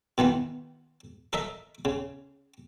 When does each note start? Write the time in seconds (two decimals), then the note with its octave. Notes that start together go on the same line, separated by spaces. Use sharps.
0.18 B2 D#3 E3 B3
1.33 A4 A#4 D#5 E5
1.85 C#3